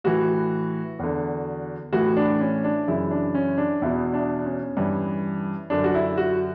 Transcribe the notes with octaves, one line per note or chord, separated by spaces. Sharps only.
A2 E3 F#4
E2 D3
A2 E3 F#4
D4
C#4
D4
F#2 C#3 E3 E4
D4
C#4
D4
E2 B2 E4
D4
C#4
G2 E3
F#2 D3 D4
F#4
E4
F#4